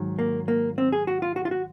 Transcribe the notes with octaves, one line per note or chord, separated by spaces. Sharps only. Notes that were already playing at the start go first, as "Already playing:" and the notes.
Already playing: G#2 D#3 F#3
A#3
A#3
C4
G#4
F#4
F4
F#4
F4
F#4